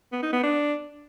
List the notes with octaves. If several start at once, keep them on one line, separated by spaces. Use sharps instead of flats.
B3
D#4
B3
D4